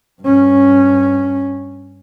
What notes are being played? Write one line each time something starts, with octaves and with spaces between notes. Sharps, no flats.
G2 C#4